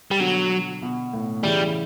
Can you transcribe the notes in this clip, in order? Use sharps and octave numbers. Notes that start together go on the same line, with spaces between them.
G3
B2 D3 F#3
B2
A2
C#3 E3 G3